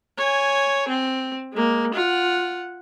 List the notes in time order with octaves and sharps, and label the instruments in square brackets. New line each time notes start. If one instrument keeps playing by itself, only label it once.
[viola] C#5 G#5
C4
G#3 A#3
F4 F#5